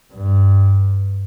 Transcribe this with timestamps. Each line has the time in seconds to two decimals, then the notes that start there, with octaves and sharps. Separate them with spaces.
0.13 G2